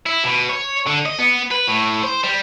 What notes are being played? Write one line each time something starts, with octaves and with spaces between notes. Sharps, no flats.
E4
B2
C#5
D3
D#5
B3
B4
A2
C5
G3